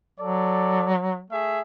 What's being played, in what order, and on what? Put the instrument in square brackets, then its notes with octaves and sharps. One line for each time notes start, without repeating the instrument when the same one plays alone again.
[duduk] F#3 [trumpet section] A4 D5
[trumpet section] A3 G#4 E5